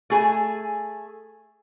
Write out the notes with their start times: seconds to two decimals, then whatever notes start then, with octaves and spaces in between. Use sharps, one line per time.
0.10 A3 G#4 A#4 G#5